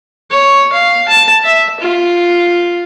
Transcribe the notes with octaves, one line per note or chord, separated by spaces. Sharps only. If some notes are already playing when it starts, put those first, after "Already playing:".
C#5
F5
A5
E5
F4